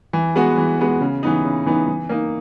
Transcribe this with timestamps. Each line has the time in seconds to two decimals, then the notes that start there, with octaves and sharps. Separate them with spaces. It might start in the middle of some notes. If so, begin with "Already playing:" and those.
0.13 E3
0.36 G#3 B3 F#4
0.58 E3
0.79 G#3 B3 F#4
1.01 C#3
1.23 E3 B3 D#4
1.45 C#3
1.66 E3 B3 D#4
1.88 E3
2.09 A#3 D#4